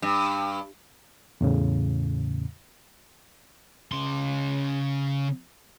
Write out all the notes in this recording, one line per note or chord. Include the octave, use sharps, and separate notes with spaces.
G2
E2 A2 C#3
C#3 C6